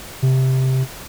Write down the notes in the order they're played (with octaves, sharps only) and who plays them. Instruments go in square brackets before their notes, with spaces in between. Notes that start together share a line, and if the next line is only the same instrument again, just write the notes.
[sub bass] C3